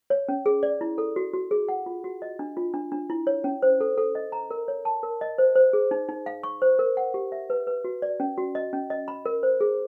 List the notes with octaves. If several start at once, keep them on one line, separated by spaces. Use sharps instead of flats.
C#5
C#4
G#4
D5
E4
A4
F#4
F#4
G#4
F#5
F4
F#4
D#5
D4
F4
D4
D4
E4
C#5
C#4
C5
A4
A4
D#5
A#5
A#4
C#5
A5
A#4
D#5
C5
C5
G#4
D#4
D#4
F5
C#6
C5
A#4
F#5
G4
E5
B4
B4
F#4
D5
C#4
F#4
D#5
C#4
D#5
B5
A#4
C5
G#4